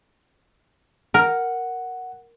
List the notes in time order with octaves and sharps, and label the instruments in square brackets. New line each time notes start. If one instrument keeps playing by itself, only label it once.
[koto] A#4 [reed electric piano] F#5